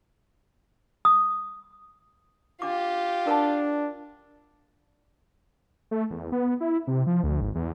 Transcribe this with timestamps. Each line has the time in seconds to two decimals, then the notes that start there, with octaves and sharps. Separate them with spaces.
1.05 D#6
2.62 D4 F4 G4 D6
3.27 D4 A#4 F#5 A5
5.91 A3
6.11 E2
6.32 B3
6.61 E4
6.87 C3
7.07 F3
7.23 D2
7.41 G#1
7.55 E2